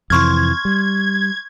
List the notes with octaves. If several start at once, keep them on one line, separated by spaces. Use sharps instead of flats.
F2 C3 E3 C6 C#6 F6 G#6
G3